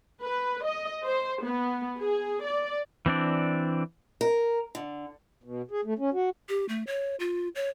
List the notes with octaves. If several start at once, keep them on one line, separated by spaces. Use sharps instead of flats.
B4
D#5
C5
B3
G#4
D5
E3 C4 D4 D5
A#4
D3
B2
G#4
A3
C#4
F#4
G4
A3
C#5
F4
C#5